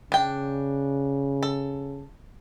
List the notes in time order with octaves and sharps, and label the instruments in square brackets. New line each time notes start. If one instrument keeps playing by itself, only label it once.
[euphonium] C#3 [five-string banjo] D4 G5
[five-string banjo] A4